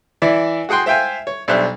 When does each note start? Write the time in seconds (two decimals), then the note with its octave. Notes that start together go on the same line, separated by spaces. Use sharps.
0.22 E3 E4 D5 E5
0.69 F#4 G#4 F#5 G5 C6
0.86 C5 E5 F5 G5 G#5
1.27 C#5
1.48 B1 G3 D4 C5 E5 F#6